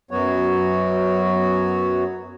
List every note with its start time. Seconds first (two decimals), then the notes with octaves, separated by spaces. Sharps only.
0.11 F#2 F#3 B3 F#4 C#5